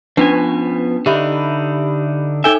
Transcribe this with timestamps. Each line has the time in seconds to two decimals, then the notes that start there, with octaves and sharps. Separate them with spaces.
0.17 F3 B3 C#4 D4 B4 G#5
1.06 D3 D4 D#4 G4 E5 B5
2.44 D#4 A4 E5 G5 G#5